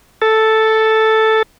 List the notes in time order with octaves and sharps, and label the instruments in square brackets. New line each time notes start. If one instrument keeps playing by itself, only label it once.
[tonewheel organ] A4